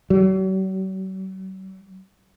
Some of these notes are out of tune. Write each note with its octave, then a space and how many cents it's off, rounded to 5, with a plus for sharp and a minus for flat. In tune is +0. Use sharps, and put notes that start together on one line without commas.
F#3 +45